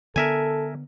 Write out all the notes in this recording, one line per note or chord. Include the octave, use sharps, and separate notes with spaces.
D3 B3 A4 A#4 E5 G#5